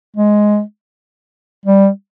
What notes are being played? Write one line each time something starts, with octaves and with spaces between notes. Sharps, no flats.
G#3
G3